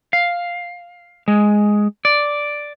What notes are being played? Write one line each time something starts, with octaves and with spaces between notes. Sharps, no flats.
F5
G#3
D5